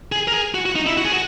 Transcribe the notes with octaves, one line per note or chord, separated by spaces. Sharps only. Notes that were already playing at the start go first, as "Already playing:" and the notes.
G#4
A#4
G#4
F#4
F#4
D#4
E4
F#4
G#4
F#4